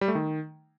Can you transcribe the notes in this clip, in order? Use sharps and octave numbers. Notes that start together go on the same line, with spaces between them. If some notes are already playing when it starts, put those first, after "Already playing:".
G3
A3
D#3